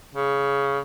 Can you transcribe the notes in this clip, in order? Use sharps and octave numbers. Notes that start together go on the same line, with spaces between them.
C#3